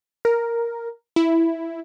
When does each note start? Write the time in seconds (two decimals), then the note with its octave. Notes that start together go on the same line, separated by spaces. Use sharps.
0.25 A#4
1.16 E4